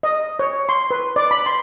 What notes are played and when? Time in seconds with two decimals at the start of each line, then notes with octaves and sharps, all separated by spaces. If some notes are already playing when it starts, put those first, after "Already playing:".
0.03 D#5
0.39 C#5
0.69 C6
0.91 B4
1.16 D5
1.31 B5
1.46 C6